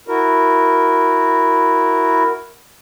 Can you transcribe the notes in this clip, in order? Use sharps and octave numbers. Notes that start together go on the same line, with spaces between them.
E4 F#4 A#4